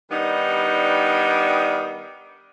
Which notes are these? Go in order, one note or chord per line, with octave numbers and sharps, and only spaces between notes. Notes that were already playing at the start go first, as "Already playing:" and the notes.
D#3 G3 B3 D4 D#4